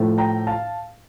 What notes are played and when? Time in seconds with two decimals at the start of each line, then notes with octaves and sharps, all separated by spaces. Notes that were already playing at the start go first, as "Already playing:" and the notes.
Already playing: A2 F3 A3
0.18 G5 A#5
0.47 F5 A5